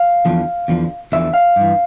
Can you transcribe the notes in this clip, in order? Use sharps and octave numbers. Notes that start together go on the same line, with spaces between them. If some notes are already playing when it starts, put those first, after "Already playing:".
Already playing: F5
E2 D3 F3
E2 D3 F3
E2 D3 F3 E5
F5
G2 E3